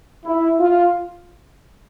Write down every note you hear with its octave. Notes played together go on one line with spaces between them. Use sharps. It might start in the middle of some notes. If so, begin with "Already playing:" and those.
E4
F4